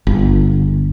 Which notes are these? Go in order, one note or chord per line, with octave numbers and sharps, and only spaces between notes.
G1